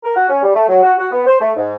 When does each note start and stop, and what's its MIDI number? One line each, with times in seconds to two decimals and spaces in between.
0.04 0.15 70
0.16 0.26 66
0.29 0.40 61
0.43 0.54 55
0.55 0.64 57
0.69 0.82 54
0.83 0.93 66
0.98 1.06 66
1.11 1.21 59
1.26 1.36 72
1.40 1.51 57
1.56 1.76 44